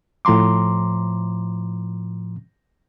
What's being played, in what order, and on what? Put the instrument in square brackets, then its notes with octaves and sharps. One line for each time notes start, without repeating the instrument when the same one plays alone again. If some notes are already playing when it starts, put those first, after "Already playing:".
[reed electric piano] A2 F3 A#5 C6 D6